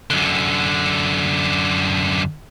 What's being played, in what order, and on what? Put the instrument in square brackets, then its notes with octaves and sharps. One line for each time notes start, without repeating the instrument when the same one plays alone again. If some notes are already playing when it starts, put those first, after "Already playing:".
[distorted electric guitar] F#2 D3